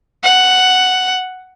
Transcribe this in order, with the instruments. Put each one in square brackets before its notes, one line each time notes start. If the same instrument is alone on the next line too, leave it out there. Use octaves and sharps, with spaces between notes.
[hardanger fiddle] F#5